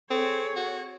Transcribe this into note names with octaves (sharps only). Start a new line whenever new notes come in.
C4 G#4 A4 C#5
F#4